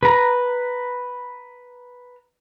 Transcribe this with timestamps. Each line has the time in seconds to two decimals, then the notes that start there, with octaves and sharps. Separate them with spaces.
0.03 B4 A#5